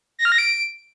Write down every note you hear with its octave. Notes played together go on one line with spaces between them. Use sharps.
A#6
F6
A#6
D7